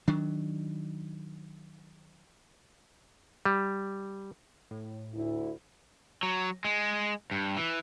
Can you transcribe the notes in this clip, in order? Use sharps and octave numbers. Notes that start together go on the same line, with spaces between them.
D#3 F#3 D4
G3
A2
D2 E4
F#3
G#3
G2
E3